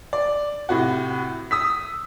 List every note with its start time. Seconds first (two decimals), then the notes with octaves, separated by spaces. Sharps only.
0.13 D5
0.69 A2 C3 F#4
1.51 D#6 E6 B6